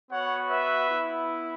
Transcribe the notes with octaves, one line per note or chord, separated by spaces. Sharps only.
B3 F#4 C#5 F#5
B4 E5
B3 E4